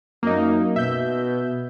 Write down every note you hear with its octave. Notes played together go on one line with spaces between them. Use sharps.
F#2 A#3 D#4
B2 E5 G6